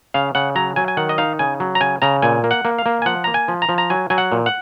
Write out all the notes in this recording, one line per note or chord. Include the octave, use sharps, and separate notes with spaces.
C#3 F5
C#3 F#5
F#3 A#5
F#3 G#5
G#5
D#3 F#5
D#5
D#4 F5
C#3 G#5
F#3
A#5
C#3 G#5
C#3 A#5
A#2 G#5
A#3
F#5
A#3
F5
A#3
G#5
F3 F#5
A#3 A#5
G#5
F3
A#5
F3
A#5
F#3 G#5
F#3 G#5
F#5
A#2
F#5